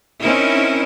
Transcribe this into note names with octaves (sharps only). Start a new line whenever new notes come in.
C4 C#4 D#4 E4 A#4